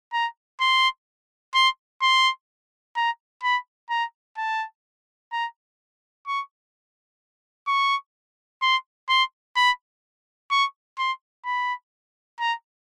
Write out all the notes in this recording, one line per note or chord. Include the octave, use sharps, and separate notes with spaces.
A#5
C6
C6
C6
A#5
B5
A#5
A5
A#5
C#6
C#6
C6
C6
B5
C#6
C6
B5
A#5